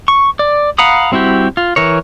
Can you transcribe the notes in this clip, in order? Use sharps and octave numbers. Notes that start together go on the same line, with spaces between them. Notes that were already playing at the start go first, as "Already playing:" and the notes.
C#6
D5
F5 F#5 A#5 B5 D#6
G3 C4 E4 F#4 G4
F4
E3 A#4 C#5